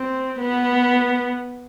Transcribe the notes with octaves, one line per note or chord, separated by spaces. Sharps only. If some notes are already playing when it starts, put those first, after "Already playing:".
Already playing: C4
B3